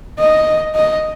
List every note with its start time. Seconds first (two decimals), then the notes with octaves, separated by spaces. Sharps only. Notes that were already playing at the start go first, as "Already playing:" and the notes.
0.19 D#5
0.75 D#5